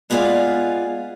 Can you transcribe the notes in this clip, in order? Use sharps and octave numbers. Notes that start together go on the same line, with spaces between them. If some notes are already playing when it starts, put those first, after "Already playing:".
G#3 B3 F4 G#4 D5 F5